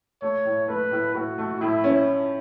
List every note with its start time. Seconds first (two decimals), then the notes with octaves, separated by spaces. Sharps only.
0.22 A3 C#5
0.45 A2
0.68 A3 B4
0.91 A2
1.15 A2 F#4
1.38 A3
1.60 A2 E4
1.84 C#4